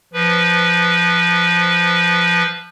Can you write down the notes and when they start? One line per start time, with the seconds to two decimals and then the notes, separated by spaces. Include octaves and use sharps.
0.13 F3 B4